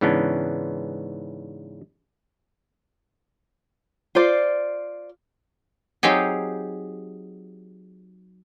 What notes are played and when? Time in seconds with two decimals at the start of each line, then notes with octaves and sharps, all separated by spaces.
0.01 G#2 C#3 E3 B3 C#4 D4
4.15 F4 C5 D5
6.03 F#3 C4 D#4 G4 G#4